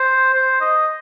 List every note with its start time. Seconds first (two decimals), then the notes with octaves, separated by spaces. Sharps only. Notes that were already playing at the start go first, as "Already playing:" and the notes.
Already playing: C5
0.33 C5
0.61 D#5